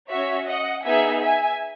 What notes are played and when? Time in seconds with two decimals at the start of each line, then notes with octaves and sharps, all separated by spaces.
0.10 C#4 F#4 C#5 E5
0.47 D#5 F#5
0.85 B3 D#4 G#4 E5 G#5
1.22 E5 G#5